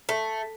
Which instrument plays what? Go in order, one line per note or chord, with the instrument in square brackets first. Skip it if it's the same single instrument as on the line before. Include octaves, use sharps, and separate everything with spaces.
[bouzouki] A3